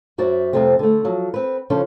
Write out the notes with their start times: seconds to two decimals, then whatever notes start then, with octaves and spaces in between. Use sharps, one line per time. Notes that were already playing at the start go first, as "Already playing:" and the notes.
0.18 F#2 F#4 C5 D5 E5
0.53 F2 C3 F3 G3 A3 C4
0.79 D3 A3
1.04 F3 F#3
1.34 C4 B4
1.70 C#3 F3 C#4 D4 A4 C5